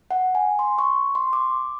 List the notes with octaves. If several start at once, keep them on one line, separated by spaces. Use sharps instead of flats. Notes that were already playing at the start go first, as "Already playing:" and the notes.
F#5
G#5
C6
C#6
C6
D6